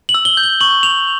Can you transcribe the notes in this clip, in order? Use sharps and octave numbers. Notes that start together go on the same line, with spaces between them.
F#7
E6
G7
G6
G7
C#6 F#7
C#6 F7